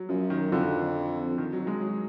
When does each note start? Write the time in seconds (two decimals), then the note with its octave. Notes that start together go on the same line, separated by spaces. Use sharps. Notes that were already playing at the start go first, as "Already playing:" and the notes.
Already playing: F#3
0.09 F#2 F3
0.30 D#3
0.51 F2 D3
1.38 D#3
1.53 F#3
1.67 G#3
1.81 F#3